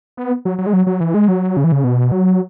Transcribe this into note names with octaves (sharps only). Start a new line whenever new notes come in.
B3
F#3
F#3
G#3
F#3
F#3
E3
G#3
F#3
C#3
E3
C#3
B2
F#3